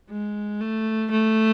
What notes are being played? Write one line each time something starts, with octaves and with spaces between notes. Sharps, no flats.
G#3
A3
A3